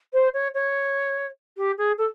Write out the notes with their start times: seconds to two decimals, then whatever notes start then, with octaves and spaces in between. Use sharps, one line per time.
0.13 C5
0.33 C#5
0.54 C#5
1.57 G4
1.77 G#4
1.98 A4